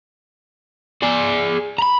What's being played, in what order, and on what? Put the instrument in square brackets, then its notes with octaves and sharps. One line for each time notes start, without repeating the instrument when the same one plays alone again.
[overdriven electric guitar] G#4 D5
A#5 B5